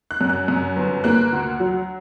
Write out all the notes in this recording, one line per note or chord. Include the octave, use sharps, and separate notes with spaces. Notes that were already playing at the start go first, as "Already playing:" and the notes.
F#6
F#2
F#6
F#2
G1
A#3 F#6
D2
F#3